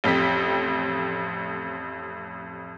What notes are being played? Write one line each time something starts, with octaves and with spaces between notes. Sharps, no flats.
A1 F2 G4 B6